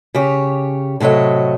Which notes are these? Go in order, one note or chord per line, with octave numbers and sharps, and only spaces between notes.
C#3 G4 C#5
A2 C3 F#3 A4 D#5